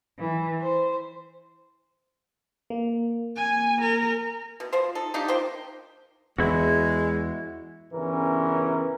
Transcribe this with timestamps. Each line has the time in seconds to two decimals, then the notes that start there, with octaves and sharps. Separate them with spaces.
0.19 E3
0.61 C5
2.70 A#3
3.36 G#5
3.81 A#4
4.60 B2
4.73 F3 F4 C5
4.95 D#4 A4
5.14 D4 D#4 F4 G4
5.28 A#3 C5 G5
6.38 E2 G#3 E4 F#4
7.93 G2 C#3 E3 B3 C#4 A#4